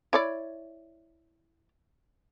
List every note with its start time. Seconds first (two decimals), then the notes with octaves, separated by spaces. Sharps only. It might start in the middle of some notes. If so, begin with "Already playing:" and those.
0.13 E4 C#5 D5